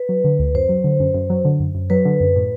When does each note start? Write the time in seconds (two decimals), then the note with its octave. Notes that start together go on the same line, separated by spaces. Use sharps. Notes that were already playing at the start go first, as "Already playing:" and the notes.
Already playing: B4
0.09 F#3
0.24 D3
0.39 D2
0.54 F#2 C5
0.69 F#3
0.84 D3
1.00 F#2
1.14 F#2
1.30 F#3
1.45 D3
1.60 F#2
1.75 F#2
1.90 F#3 B4
2.05 D3
2.20 F#2
2.36 A2